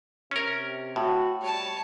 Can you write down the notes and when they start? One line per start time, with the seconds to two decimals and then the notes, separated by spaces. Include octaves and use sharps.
0.31 C3 C#4 A#4
0.96 A2 F#4
1.42 G3 C#5 A5